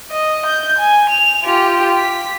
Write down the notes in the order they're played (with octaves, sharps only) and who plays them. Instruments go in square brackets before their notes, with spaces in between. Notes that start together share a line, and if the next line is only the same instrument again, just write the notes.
[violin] D#5
G6
G#5
F7
F4 G4
B6